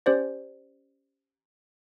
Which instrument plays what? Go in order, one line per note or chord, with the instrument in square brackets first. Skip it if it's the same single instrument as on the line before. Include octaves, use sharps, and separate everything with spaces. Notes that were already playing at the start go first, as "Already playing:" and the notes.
[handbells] C#4 G4 C5 D5